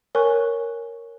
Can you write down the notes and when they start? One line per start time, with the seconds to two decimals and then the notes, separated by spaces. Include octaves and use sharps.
0.15 A#4 C#5 G#5 C#6 F#6